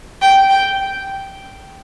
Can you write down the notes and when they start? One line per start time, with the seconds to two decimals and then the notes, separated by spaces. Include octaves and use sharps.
0.21 G5
0.49 G5